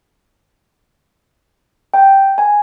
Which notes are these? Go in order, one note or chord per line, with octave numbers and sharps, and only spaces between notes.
G5
G#5